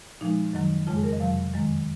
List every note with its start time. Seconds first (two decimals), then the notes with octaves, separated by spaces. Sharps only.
0.21 A#2 F3 G#3 D#4
0.53 F#2 D#3 F#3
0.87 F2 C#3 G#3 F4
0.96 G#4
1.03 A#4
1.12 D#5
1.20 F2 C3 F#3 F5
1.54 F#2 D#3 G#3